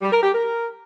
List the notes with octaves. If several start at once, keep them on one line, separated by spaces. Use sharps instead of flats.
G3
A#4
G4
A#4